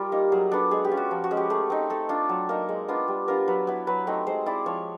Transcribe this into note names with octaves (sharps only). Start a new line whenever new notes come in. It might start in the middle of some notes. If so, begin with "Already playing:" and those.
Already playing: G3 F4 A#4
A#3 D#4
F#3 G#4
B3 D4 A4
G#3 G#4
G4
C#4 F4
F#4
F3
F#4
G#3 C#4
G4
A3 G#4
C4 D#4
A3 A4
D4 F4
F#3
A#3 D#4
G#3
B3 D4 F4
G3
B3 D4 F4 A#4
F#3 B4
B3 E4
F#3 B4
A3 C4 D#4
G#3 C5
C4 E4 D5
F3 C#5